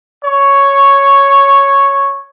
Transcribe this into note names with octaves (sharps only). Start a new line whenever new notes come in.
C#5 C#6